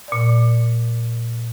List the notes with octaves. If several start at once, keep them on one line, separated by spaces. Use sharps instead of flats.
A#2 D5